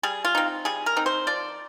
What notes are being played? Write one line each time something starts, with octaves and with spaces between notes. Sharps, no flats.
G3 G#4
F4
C4 D#4
G3 G#4
A#4
C4 D#4
C5
F3 D5